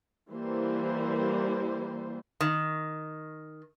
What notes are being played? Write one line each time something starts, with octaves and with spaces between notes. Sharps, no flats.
E3 G3 A#3 C5
D#3